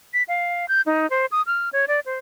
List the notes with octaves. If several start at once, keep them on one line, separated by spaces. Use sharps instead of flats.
B6
F5
G6
D#4
C5
D#6
F6
C#5
D5
C5